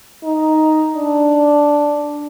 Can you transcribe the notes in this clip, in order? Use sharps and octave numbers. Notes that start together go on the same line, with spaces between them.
D#4
D4